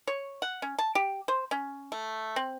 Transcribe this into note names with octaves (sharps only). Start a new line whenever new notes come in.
C#5
F#5
C#4
A5
G4
C5
C#4
A3
C4